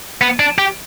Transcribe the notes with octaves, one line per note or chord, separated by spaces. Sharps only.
B3
D4
G4